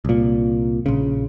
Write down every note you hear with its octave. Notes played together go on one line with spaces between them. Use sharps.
C2 A#2
A#1 C#3